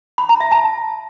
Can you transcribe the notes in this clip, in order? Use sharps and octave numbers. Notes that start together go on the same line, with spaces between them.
B5
A#5
E5
A5